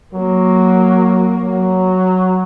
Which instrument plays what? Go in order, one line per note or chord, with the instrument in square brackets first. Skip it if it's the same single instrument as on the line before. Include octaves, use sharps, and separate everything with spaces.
[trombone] F#3 [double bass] A#3
[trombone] F#3